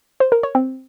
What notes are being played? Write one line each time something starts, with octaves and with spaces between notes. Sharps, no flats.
C5
A#4
C#5
C4